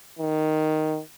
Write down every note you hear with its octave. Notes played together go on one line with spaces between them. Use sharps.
D#3